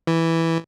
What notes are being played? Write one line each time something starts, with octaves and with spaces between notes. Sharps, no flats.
E3